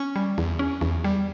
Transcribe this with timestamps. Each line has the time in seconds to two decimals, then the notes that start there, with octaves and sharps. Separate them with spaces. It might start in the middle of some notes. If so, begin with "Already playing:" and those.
Already playing: C#4 C#6
0.16 G3
0.38 E2
0.59 C#4
0.81 E2
1.04 G3